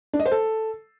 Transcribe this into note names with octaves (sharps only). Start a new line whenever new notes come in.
D4
D#5
C5
A4